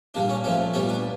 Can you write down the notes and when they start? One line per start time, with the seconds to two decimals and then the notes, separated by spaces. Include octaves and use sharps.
0.14 A#2 G3 A#3 D4
0.29 C#4
0.44 A#2 F3 A3 C#4
0.74 A#2 G3 B3 C#4
0.89 D4